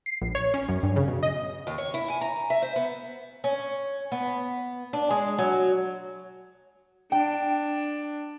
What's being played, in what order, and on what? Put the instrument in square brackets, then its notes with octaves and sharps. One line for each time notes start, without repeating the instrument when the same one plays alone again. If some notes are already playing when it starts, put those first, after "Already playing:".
[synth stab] C7
A#1
C#5
C#4
F#2
G2
C#3
B2
D#5
[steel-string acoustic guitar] D#2
C#5
E4
G#5
A#5
E5
C5
B3
[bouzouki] C#4
B3
D4
G#3
F#3
[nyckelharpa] D4 [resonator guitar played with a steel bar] G5